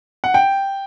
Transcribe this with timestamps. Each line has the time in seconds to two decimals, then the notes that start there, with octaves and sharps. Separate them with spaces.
0.24 F#5
0.34 G5